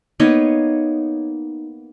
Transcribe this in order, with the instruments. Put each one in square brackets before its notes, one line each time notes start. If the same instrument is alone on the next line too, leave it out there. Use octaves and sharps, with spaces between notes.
[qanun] A#3 B3 D#4 C#5